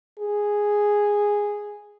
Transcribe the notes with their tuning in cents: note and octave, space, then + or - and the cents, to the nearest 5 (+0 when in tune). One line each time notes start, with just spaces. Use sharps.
G#4 -5